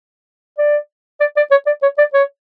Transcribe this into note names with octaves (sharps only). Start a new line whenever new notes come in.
D5
D5
D5
C#5
D5
C#5
D5
C#5